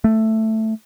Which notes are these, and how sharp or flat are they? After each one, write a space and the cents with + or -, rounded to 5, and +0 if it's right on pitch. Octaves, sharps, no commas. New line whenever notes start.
A3 +5